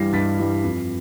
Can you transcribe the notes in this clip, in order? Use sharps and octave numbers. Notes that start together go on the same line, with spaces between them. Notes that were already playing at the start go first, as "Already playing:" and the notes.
Already playing: G2 E3 G3 A#6 C7
G2 A6 B6
E3 G3
F2